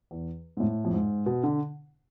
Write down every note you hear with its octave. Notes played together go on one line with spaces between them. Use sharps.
E2
G#2
A2
F2
G#2
B2
D3